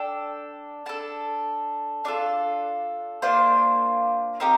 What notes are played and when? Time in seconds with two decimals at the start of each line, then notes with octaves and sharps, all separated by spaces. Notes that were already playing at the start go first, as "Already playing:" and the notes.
Already playing: D4 A4 G5
0.86 D4 A4 A5
2.05 D4 F4 A4 D5
3.22 A#3 D4 F4 C5
4.40 C4 D#4 G4 A#4